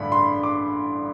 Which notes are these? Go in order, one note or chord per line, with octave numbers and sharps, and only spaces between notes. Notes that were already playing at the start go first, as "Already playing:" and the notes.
Already playing: A1 G2 D3 B5
C6
D6